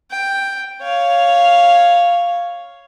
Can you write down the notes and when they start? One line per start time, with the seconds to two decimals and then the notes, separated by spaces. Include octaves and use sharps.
0.11 G5
0.82 C#5 F5